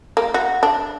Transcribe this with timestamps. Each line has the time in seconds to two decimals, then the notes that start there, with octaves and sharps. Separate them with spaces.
0.17 A#3
0.34 F#4
0.63 D4